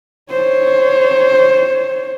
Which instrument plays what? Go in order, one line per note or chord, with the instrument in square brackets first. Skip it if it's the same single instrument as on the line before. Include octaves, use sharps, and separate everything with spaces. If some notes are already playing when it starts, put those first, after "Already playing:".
[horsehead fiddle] C5 C#5